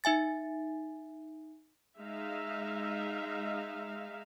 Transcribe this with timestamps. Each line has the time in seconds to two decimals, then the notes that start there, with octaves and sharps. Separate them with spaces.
0.04 D#4 E5 G#5 A6
1.98 G#3 D#4 E5 F5